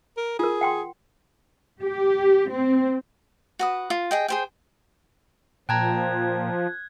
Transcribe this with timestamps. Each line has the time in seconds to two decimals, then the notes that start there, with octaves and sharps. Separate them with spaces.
0.17 A#4
0.39 F4 G#4 A#4
0.61 F#5 G5 C6
1.82 G4
2.51 C4
3.59 F#4 B4 D#6
3.90 F4
4.11 G#4 D#5 G5
4.28 G#4 C5 G5
5.69 A#2 F3 G5 A5 A#5 F#6 G#6